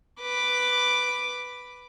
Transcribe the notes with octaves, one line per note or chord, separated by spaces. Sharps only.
B4 D6